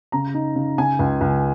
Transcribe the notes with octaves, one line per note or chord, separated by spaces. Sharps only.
C#3 A#5
D#4
C#3
C#3 G#5
C#2
C#2